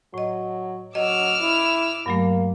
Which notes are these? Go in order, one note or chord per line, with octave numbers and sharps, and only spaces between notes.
A2 F#3 D#5
F#3 D#5 D6 E6 F6
E4
G2 F#3 A3 A#3